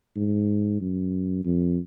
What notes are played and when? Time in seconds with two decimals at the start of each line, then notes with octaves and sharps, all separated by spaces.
0.17 G#2
0.81 F#2
1.45 F2